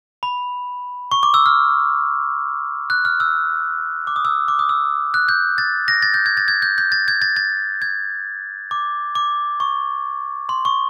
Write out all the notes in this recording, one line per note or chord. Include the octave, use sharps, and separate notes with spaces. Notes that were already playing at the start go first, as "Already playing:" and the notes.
B5
C#6
D6
E6
F6
F#6
F6
E6
D6
D#6
E6
D6
D#6
E6
F#6
G6
A6
A#6
A6
G6
G#6
A6
G#6
G6
G6
A6
G#6
A6
A6
G#6
D6
D6
C#6
C6
C#6